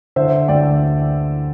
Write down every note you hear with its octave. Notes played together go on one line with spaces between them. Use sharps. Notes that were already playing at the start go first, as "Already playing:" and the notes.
D3 C5 E5
D2 D5 G5